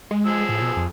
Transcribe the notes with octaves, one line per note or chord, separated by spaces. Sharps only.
G#3
F3 G#4 E6
A2
B2
F2